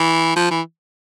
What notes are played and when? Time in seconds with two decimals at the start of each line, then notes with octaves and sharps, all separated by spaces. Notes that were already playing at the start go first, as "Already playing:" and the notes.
Already playing: E3
0.36 F3
0.51 E3